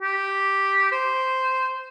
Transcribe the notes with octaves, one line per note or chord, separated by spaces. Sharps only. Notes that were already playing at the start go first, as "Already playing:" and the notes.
G4
C5